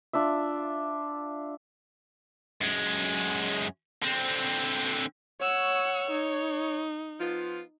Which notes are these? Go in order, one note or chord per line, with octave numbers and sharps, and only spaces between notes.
D4 F4 E5
F#2 G#3
D3 C4
C#5 F#5 E6
D#4
F3 B3 F4